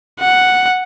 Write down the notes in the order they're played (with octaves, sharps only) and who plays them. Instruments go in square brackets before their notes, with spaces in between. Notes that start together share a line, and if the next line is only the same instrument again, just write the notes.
[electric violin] F#5